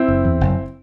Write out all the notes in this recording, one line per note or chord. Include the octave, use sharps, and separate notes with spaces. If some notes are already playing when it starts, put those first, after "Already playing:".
Already playing: C4 E4
F#1
E2
F#1